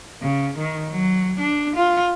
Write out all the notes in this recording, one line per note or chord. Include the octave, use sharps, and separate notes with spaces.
C#3
D#3
F#3
D4
F4